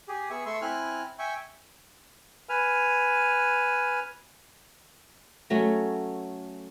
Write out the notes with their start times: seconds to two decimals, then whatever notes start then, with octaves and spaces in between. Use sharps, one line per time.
0.08 G4 G#4
0.30 B3 G#4 E5 C#6
0.46 A3 E5 C6 C#6
0.62 C4 E4 G#5 F6 F#6
1.19 E5 G5 G#5 C#6
2.49 B4 G#5 F6
5.50 F#3 A3 C#4 F#4